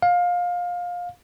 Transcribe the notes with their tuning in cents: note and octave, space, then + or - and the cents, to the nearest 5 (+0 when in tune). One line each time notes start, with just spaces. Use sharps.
F5 +20